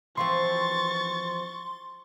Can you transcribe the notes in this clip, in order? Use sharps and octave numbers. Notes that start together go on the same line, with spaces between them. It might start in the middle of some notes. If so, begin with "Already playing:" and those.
E3 F3 C4 C6 C#6 A6